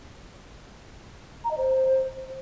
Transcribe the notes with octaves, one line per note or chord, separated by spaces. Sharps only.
A#5
D#5
C5